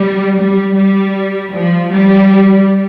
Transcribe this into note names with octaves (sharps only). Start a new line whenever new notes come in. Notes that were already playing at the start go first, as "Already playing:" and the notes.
Already playing: G3
G3
G3
F3
G3